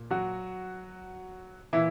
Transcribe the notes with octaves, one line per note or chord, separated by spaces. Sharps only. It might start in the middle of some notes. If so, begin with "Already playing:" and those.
Already playing: A#2
F#3 F#4
A#2 E3 E4